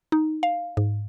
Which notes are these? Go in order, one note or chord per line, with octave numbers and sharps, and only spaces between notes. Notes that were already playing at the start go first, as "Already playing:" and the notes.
D#4
F5
G#2